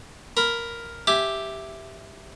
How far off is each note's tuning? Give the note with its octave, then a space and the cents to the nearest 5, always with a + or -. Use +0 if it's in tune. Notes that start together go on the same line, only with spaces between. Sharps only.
A#4 +0 B5 +10
G4 +0 E5 +0 G#5 +0